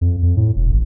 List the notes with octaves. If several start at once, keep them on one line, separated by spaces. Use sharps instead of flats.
F2
F2
A2
E1
A1